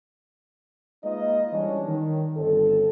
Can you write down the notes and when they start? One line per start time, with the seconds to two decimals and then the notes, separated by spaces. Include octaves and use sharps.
1.04 G#3 A#3 D#4 F4 B4 D#5
1.53 E3 G3 C#4 D4 C#5
1.87 D#3
2.37 G1 C4 A4